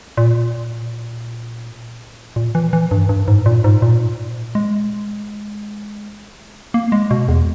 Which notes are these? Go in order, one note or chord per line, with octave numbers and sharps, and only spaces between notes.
A#2
A#2
E3
E3
G2
G2
G#2
A#2
G#2
A#2
G#3
A#3
G#3
B2
E2